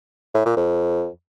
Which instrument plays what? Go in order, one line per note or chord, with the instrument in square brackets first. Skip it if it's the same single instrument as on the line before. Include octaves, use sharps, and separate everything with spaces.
[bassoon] A2
A#2
F2